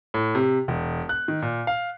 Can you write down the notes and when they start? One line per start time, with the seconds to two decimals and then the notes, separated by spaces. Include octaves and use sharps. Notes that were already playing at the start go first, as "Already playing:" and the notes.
0.14 A2
0.35 C3
0.68 E1
1.09 F#6
1.28 D#3
1.42 A#2
1.67 F5